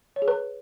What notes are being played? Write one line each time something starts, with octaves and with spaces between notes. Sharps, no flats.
C#5
G#4
B4